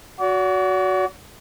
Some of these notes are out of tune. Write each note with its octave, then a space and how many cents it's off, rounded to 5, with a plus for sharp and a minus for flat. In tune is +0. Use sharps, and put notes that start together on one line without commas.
F#4 +0 D5 -45